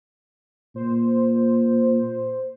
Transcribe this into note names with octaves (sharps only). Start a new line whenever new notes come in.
A#2 C5